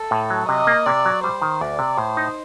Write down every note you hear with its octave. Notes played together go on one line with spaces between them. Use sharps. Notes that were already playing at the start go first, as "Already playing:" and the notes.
Already playing: A4
A2
F#3
C3 D#5
A#3
C3 D5
F#3
G3 C5
D#3
D2 D5
C3
A2 C5
D#4